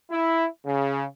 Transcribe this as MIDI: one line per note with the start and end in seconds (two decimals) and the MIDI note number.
0.11 0.46 64
0.66 1.04 49